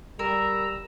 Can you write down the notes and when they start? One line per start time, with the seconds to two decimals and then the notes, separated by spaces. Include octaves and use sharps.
0.19 G3 A#4 A#5 E6